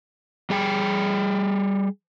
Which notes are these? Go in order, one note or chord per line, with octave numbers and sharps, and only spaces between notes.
G3 G#4 G5